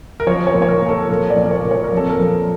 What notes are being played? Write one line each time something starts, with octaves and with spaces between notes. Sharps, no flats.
A#4
F3 C#5
C#5
A#2
C#5
A#4
A#2
A4
F3 A#4
D5
A#2
A#4
C#5
A#2
C#5
A#4
F2
A4
A#4
F3